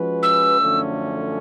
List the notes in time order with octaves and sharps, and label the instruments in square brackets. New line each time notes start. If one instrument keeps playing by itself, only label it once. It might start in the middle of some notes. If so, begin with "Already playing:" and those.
Already playing: [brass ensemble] F3 G#3 C#4 F#4 B4
[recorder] E6
[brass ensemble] F#2 D3 F3 A3 C#4